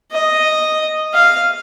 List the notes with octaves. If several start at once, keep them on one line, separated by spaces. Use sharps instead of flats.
D#5
F5